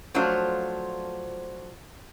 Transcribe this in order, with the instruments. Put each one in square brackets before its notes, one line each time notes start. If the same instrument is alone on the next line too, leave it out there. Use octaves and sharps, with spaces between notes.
[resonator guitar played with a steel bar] F3 F#3 A3 D4 F4 C5